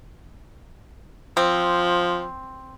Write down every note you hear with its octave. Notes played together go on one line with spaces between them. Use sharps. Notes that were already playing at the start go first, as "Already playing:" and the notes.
F3 C4